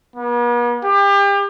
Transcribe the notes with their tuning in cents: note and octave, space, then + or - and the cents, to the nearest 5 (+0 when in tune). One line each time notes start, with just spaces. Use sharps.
B3 -45
G4 +35